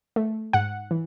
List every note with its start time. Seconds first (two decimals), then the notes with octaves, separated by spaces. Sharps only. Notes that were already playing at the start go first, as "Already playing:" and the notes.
0.16 A3
0.53 G#2 F#5
0.91 E3